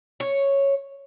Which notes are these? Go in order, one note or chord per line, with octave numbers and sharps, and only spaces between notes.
C#5